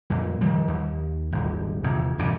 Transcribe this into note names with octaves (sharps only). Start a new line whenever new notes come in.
F2 A#2
D#3 F3 G3
D#2
D#1 G#1
F1 E2
E1 G2 C#3